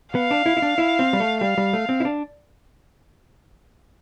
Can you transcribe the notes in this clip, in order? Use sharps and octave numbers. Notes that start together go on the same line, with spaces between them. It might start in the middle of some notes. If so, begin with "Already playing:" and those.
B3 F5
D4
E4
E4
D4
E4
C4
G3
A3
G3 F5
G3
A3
C4
E4
D4